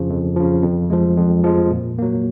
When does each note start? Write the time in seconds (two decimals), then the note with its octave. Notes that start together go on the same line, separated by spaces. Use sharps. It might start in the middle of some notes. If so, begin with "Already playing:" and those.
Already playing: F2 C#3 F3
0.10 F2
0.36 C#3 F3
0.63 F2
0.90 F3 G#3
1.17 F2
1.44 F3 G#3
1.71 A#2
1.99 F#3 A#3